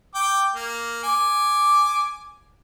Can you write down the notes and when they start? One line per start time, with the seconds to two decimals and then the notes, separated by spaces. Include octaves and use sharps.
0.15 G5 D6
0.56 A#3
1.03 G#5 D6